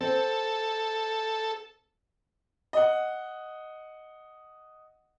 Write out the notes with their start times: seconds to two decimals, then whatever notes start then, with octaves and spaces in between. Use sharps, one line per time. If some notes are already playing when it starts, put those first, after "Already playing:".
0.01 C4 A4
2.73 D#5 F#5